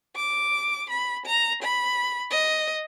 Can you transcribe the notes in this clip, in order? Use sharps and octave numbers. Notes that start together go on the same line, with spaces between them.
D6
B5
A#5
B5
D#5